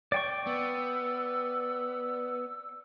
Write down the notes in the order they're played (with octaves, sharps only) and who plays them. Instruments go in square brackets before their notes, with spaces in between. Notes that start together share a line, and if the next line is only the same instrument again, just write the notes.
[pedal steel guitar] D5 G5 C#6
[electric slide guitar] B3 [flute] E6